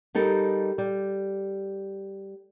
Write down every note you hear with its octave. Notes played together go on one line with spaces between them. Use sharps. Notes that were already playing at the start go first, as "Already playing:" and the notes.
G3 D#4 A4 A#4
G3